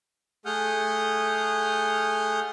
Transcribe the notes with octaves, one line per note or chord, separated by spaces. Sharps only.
A3 G#4 F#5 D#6 F6 G6